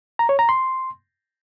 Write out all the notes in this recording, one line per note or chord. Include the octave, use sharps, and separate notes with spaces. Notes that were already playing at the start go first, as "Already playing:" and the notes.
A#5
C#5
A#5
C6